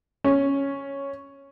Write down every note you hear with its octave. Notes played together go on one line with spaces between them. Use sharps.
C#4